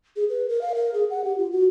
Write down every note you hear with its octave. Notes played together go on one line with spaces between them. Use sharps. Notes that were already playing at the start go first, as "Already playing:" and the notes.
G#4
B4
A#4
F5
A#4
G#4
F#5
G4
F4
F#4